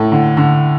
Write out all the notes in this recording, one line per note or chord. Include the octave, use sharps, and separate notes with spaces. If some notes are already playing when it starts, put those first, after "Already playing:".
Already playing: A2 A4
D3
D3